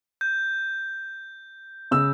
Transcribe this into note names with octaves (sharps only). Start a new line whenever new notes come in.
G6
C#3 E6